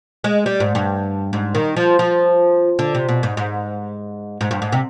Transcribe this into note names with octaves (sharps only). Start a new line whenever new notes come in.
G#3
G3
G#2
G2
G#2
D#3
F3
F3
D3
C3
B2
G#2
G#2
G#2
G2
G#2
C3